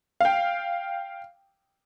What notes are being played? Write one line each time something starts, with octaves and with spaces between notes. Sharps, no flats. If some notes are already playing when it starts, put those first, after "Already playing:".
F5 G5